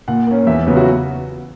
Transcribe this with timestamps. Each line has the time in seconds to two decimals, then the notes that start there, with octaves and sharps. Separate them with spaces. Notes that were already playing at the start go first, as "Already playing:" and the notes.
0.08 A#2 F#5
0.27 A#3 C#4
0.47 E2 E5
0.66 C#3 F#3 B3
0.77 F#4